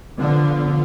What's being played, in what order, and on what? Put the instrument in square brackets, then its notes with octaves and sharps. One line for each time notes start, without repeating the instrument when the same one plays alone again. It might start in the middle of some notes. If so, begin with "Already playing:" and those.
[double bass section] D3 [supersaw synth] F3 B3 F4